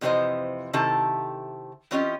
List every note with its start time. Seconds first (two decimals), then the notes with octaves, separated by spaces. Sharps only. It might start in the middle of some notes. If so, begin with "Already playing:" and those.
0.01 F2 C3 E3 B3 C5 D#5
0.73 C3 D#3 E4 G4 A4 A5
1.91 E3 C4 C#4 F4 G4 D#5